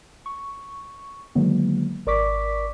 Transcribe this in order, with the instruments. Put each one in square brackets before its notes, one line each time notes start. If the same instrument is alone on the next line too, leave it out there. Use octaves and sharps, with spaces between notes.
[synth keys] C#6
D3 D#3 F#3 G#3 A#3 B3
G#1 A#4 D5 C#6 D6 B6